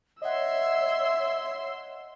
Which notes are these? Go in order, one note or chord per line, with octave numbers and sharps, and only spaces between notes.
C#5 D#5 E5 F#5 C6 E6